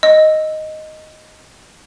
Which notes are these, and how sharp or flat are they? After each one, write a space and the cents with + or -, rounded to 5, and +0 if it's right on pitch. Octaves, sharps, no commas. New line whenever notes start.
D#5 +0 E6 +0